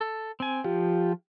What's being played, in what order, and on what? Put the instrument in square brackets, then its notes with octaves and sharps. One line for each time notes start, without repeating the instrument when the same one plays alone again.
[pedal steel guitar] A4
C4 G#5
[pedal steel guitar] F3 [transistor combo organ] F4 G4